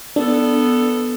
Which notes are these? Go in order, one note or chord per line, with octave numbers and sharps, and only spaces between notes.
B3 D4 A4